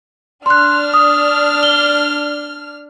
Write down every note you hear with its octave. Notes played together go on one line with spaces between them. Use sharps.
D4 C6 F6 F#6
D#6
G7